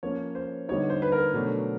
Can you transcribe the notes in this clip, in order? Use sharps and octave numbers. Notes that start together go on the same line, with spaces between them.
F3 A#3 C#4 C#5
C5
D3 G3 B3 D#4 C#5
C5
B4
A#4
B2 F#3 A3 D4